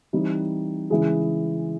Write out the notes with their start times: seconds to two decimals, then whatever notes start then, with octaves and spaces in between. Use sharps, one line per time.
0.13 E3 G3 C4 D#4
0.90 C#3 E3 G#3